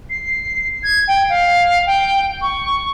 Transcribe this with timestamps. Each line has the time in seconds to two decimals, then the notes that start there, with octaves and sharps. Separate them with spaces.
0.10 C7
0.83 G#6
1.08 G5
1.30 F5
1.87 G5
2.42 C#6